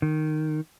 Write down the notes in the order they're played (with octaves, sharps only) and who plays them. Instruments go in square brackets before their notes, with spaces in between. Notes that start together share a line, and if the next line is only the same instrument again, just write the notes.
[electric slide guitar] D#3